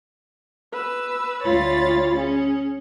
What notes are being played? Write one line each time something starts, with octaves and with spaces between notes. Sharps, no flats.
B4 E6
D2 F4 C#5 B5 A6
C#4 G#4